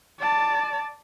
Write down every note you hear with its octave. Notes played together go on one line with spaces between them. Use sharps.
D5 A5